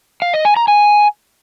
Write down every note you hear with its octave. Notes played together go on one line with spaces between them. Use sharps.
F5
D#5
G#5
A#5
G#5